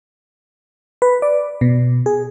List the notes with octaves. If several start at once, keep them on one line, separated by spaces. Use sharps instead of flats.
B4
D5
B2
G#4